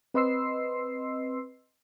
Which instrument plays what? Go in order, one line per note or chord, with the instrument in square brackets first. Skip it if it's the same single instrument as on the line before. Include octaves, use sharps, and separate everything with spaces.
[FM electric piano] C4 B4 D#5 C6 E6 C7